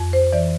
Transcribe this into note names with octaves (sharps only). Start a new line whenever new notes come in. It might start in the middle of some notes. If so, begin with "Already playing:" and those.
Already playing: F2
C5
E3 D5